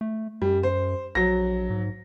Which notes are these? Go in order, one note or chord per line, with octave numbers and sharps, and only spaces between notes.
A3
F#2 G3
C5
A#1 F#3 A#6
G#2